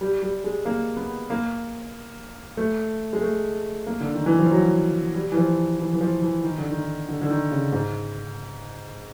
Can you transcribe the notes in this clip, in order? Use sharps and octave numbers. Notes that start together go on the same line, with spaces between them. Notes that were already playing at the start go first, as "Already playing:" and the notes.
G3
G3
G#3
A#3
B3
A#3
A3
G#3
A3
A#3
D3
D#3
E3
F3
F#3
G3
E3
F3
E3
E3
F3
E3
D#3
D3
D#3
D3
D3
D#3
C#3
G#2